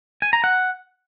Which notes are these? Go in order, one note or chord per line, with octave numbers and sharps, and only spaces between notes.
G#5
A#5
F#5